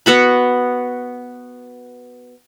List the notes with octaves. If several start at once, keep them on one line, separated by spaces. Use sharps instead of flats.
B3 F#4 B5